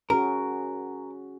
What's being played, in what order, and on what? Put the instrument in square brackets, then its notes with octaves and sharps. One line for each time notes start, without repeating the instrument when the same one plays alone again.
[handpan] C#4 F#4 G#4 [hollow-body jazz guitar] A#4